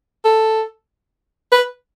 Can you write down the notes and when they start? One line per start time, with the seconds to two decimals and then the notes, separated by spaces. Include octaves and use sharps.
0.25 A4
1.52 B4